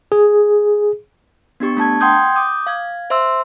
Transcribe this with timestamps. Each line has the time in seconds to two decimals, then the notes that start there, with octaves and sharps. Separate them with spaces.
0.12 G#4
1.60 B3 D4 G4 C#6
1.77 A3 D4 A5 G#6
2.00 F#5 G5 C6 D#6 G6 G#6
2.35 D6 D#6 G6
2.66 F5 G#6
3.10 C5 E5 C6 E6